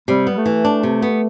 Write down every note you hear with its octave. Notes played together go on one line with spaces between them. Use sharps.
C3 G3
B3
A3
E3
D4
C3
B3